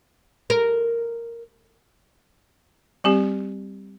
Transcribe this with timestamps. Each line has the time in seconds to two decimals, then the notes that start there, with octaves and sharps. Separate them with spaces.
0.50 A#4
3.04 G3 C4 G4